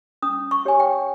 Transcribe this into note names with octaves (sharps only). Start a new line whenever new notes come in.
C#4 D#6
C#6
G4 C#5 G#5
G5